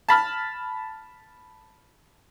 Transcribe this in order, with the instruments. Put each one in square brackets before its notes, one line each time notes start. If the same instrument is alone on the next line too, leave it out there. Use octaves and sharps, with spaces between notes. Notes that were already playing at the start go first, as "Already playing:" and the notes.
[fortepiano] A5 B5 F6